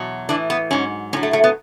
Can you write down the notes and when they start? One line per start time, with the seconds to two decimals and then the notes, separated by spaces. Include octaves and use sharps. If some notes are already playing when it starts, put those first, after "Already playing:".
Already playing: E2 B2 F#3
0.29 A2 E3 D4
0.50 B3
0.71 G#2 F#3 C#4
1.13 A2 C#4
1.17 F#3
1.23 A3
1.33 A3
1.44 B3